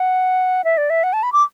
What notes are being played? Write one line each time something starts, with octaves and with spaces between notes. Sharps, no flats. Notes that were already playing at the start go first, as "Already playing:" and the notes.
Already playing: F#5
E5
D5
E5
F#5
A5
B5
D6